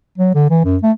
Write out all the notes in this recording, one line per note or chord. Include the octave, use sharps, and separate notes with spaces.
F#3
D3
E3
F#2
A3